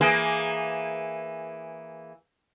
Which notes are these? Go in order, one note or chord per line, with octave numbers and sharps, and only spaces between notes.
E3 A#3 G#4